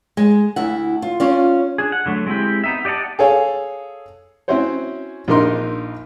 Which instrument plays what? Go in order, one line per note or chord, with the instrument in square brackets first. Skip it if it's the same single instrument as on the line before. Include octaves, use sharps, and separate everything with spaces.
[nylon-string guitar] G#3
D2 E4 F#5
F4
C#4 F4 D5
[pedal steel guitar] D4 G#4
F#5
D3 F#3 A3
G#3 C4 E4 G4
B3 D#4 E5
G4 D5 D#5 F#5 A5
[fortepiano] G#4 A4 C#5 F5
C4 C#4 E4 F#4 C5 C#5
A#1 D4 D#4 A#4 C6